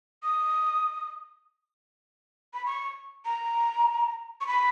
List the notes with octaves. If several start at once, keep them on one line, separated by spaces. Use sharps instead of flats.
D#6
B5
C#6
A#5
C#6
B5